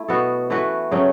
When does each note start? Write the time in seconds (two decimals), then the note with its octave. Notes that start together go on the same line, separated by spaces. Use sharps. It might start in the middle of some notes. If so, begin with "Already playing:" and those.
Already playing: A3 E4
0.08 B2 B3 F#4 A4
0.50 E3 A3 F#4 B4
0.91 C#3 F#3 A3 C#4